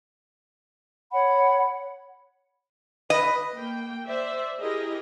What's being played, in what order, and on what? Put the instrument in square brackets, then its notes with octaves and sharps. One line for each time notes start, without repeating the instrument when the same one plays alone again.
[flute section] C#5 F#5 B5
[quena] B4 [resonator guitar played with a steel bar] D#5
[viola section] A#3 G5
C5 D5 E5
E4 G4 G#4 A#4 D#5